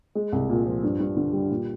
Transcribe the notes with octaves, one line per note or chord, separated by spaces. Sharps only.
G#3
C2
A#2
F3
G2
G2
D3
G3
A#2